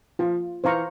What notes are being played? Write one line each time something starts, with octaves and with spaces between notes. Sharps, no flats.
F3 F4
E3 C5 F5 A#5 C#6